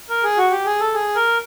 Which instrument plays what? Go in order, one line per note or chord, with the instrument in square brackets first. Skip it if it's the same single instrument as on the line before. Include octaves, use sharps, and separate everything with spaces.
[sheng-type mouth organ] A#4
G#4
F#4
G4
G#4
A4
G#4
A#4